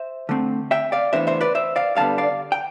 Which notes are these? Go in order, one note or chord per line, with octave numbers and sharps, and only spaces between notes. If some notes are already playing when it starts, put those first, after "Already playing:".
Already playing: C5 E5
D3 A3 C4
E5 G5
D5 F5
A2 E3 B3 D4 C5 E5
C5 E5
B4 D5
C5 E5
D5 F5
G2 D3 G3 B3 F5 A5
D5 F5
G5